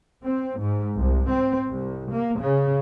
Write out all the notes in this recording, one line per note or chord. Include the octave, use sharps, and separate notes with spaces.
C4
G#2
C2
C4
C2
A#3
C#3